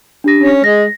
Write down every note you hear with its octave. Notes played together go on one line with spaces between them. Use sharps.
D4 G4 A#6
C#4
G#3 A#6